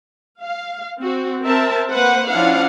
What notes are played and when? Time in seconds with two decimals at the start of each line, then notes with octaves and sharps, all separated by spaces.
0.42 F5
1.00 C4 F#4
1.44 C4 A#4 E5 A5
1.91 A#3 B4 C5 F#5
2.31 F3 C#4 D4 E4 F5 F#5